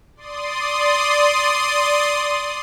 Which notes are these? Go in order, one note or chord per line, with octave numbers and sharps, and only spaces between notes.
D5 C6 D#6